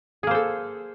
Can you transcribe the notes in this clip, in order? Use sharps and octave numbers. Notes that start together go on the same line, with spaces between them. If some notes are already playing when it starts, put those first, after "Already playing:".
A#3 G#4 A4 C5